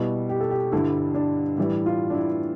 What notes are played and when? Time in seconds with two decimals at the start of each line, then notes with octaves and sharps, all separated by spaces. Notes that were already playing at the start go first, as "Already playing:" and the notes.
Already playing: B2 G3 E4
0.29 G4
0.41 A4
0.50 G4
0.72 G2 D3 G3 E4
1.15 D4
1.58 A2 E3 G3 E4
1.86 F4
2.10 D4
2.14 E4